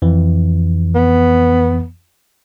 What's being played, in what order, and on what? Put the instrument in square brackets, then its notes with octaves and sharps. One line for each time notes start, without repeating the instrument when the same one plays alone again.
[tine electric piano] F2 E3
[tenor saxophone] B3